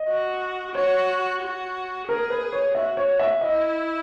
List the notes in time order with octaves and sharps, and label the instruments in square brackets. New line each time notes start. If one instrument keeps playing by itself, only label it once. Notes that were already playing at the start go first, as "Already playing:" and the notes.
Already playing: [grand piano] D#5
[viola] F#4
[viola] F#4 [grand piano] C#5
[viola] F#4
[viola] G#4 [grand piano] A#4
[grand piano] B4
C#5
[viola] F#4 [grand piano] E5
[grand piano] C#5
E5
[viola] E4 [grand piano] D#5